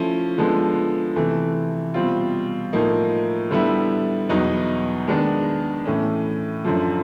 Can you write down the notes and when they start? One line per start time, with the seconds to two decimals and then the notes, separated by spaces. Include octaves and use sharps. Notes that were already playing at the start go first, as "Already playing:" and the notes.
Already playing: F3 A3 C#4 E4
0.38 D3 F3 G#3 B3
1.16 C3 E3 A3
1.94 B2 G3 C4 F4
2.73 A2 F3 A#3 D#4
3.51 D3 G3 B3 E4
4.29 E2 B2 F#3 B3 D#4
5.07 D#3 G#3 B3 D4
5.85 A2 E3 A3 C#4
6.64 F#2 D3 F3